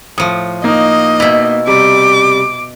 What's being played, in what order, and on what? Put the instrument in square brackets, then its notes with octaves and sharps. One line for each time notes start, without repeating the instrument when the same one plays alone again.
[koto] A2 F3 [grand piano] D#6
[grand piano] A#3 D#4 [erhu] D#5
[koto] B2 E4
[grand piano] C3 G3 [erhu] D6